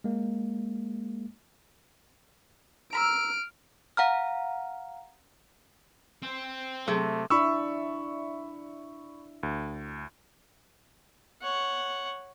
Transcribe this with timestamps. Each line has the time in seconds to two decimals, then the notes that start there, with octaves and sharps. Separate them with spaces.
0.04 G#3 A#3
2.93 A#5 B5 E6 F6 D7
3.97 F5 F#5 A#5 F6
6.22 C4
6.88 C3 F#3 A3 G#4 E5
7.30 D4 E4 D5 B5 C#6 E6
9.43 D2
11.42 C#5 F#5